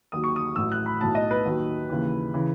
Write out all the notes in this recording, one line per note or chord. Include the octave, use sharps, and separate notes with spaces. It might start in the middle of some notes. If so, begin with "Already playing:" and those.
D#2 D#3 F#3 D#6
C#6
D#6
A1 A2 F#3 E6
F#6
B5
B1 A2 F#3 A5
D#5
B4
D#2 D#3 F#3
D#2 C#3 E3
C#3 E3